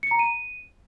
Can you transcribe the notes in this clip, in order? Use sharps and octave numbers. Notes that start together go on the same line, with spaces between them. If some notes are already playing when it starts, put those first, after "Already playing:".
C#7
A#5
D#7